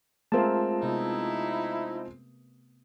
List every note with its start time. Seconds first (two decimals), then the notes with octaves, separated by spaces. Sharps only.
0.32 G#3 A3 C4 F4 A#4 E5 A5
0.82 C3 B3 D#4 E4